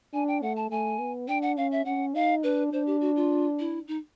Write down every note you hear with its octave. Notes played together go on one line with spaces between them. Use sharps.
D4 G#5
G5
A3 F#5
A5
A3 G#5
B3
D4 G5
F#5
C#4 F5
E5
C#4 F#5
D#4 F5
D4 B4
D4 C5
G4
F#4
F4
E4
D#4